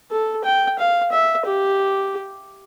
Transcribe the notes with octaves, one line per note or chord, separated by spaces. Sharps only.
A4
G5
F5
E5
G4